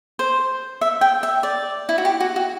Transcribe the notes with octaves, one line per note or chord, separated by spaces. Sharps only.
C5
E5
G5
E5
D5
E4
F#4
G4
F#4
F#4